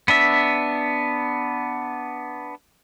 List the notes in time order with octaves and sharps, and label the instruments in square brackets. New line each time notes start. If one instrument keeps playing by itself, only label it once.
[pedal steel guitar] B3 D4 E5